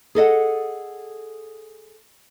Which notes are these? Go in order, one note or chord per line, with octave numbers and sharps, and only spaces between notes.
G#4 A4 D#5 F#5